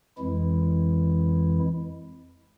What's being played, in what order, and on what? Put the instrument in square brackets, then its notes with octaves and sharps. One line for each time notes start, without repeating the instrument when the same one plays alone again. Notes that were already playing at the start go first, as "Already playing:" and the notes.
[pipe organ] F2 E3 G#3 E4